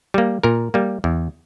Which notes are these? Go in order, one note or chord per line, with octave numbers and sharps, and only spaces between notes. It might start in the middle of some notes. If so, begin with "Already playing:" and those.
G3 A#3
A#2 A#4
G3 A#3
E2